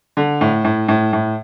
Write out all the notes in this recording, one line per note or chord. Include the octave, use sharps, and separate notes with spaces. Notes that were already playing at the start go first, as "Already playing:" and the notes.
D3
A2
A2
A2
A2